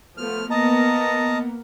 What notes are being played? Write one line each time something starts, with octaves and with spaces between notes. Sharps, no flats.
F3 A3 B3 F6
A#3 B3 A#4 D#5 A5 A#5